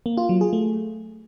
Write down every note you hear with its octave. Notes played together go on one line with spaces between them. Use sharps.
A#3
F4
F#3
G#4
A3